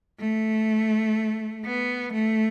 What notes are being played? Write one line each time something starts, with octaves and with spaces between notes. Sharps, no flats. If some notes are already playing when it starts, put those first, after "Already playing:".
A3
B3
A3